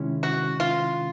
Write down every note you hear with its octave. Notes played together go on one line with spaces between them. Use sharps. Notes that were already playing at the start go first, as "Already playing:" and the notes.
Already playing: C3 D#3 G#3 C#4 E4
F#4
F4